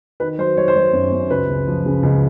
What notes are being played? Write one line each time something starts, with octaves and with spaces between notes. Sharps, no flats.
D#3 B4
F#3 C5
F#3 C#5
C5
F#3 C#5
F#2
F#2
C#2 B4
C#2
F3
C#3
C#2